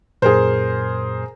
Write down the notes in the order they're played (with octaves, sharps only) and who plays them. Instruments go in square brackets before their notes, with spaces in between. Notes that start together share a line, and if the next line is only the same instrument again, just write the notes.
[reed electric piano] F#2 A#2 [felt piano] G#4 A#4 C5